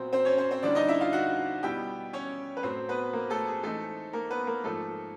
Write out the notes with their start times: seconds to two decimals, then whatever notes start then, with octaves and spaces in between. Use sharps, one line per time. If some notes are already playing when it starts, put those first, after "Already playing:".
Already playing: A#2 F#3 B3 C4 C5
0.13 C4 C5
0.25 C#4 C#5
0.38 C4 C5
0.51 C4 C5
0.63 D3 G3 A#3 C#4 D4 E4 D5
0.75 D#4 D#5
0.88 E4 E5
1.01 F4 F5
1.13 F#4 F#5
1.63 B2 G3 B3 E4 G4 G5
2.13 C#4 C#5
2.57 B4
2.63 A2 F#3 A3 C4 C5
2.89 B3 B4
3.13 A#3 A#4
3.30 A3 A4
3.47 G#4
3.63 E3 G#3 A3 C4 D#4 A4
4.13 A#3 A#4
4.31 B3 B4
4.47 A#3 A#4
4.64 G#2 F3 A3 A#3 D#4 A4